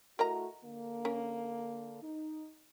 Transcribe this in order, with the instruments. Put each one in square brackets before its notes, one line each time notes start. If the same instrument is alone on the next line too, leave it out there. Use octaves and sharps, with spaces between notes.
[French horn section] A3 E4 F#4 [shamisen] A#4 D#5 A#5
[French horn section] D3 A#3
[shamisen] C#4 A#4
[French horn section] D#4